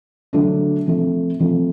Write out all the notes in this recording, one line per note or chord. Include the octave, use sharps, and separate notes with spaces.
D3 F#3 A3 D4
C3 F3 A3
C3 F3 A3